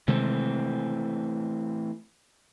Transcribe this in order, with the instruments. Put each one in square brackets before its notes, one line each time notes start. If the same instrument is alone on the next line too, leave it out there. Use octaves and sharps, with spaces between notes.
[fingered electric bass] C3 D#3 G#3 [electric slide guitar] E3 A3 C4